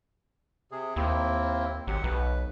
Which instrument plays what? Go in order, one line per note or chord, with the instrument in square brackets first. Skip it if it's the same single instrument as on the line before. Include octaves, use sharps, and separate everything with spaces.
[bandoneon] C3 G#4
[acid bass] D#2 [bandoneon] A#3 C4 E4
[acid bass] G#1 [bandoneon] F#3 G4 F#5
[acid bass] B1 [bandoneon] B4